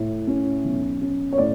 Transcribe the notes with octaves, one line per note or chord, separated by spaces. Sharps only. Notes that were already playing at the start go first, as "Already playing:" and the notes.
Already playing: A2
C#4
B1
C#4
C#5
A2 D5